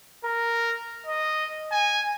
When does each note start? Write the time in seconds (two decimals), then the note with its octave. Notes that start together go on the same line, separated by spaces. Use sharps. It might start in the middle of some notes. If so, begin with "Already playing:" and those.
0.24 A#4
1.06 D#5
1.72 G#5